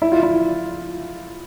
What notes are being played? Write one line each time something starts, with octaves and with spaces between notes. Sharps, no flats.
E4
F4
E4